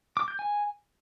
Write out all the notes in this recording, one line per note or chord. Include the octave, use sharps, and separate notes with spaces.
D6
G6
G#5